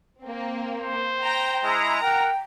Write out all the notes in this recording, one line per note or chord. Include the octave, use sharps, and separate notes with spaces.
A#3 C4
C5
G5 A#5
G#3 E4 A#5
A#4 F#5 G5